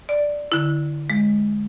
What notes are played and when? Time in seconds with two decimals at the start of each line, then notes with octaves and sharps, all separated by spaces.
0.09 D5
0.52 D3 E4
1.10 G#3